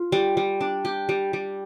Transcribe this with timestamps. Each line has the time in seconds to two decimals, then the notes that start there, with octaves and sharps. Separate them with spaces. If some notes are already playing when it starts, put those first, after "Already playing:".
Already playing: F4
0.12 G3
0.37 G3
0.61 D4
0.85 G4
1.09 G3
1.33 G3